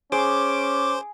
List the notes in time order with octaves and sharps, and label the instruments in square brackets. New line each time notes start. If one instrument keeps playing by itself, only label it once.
[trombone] C#4 [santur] G#4 [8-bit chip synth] C5 [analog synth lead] D6